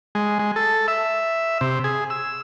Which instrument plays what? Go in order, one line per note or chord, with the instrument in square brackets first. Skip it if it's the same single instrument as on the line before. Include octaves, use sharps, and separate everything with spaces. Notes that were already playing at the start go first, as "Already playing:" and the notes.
[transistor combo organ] G#3
G#3
A4
E5
C3
G#4
E6